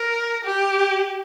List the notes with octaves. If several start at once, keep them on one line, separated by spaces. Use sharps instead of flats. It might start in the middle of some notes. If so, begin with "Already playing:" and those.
Already playing: A#4
G4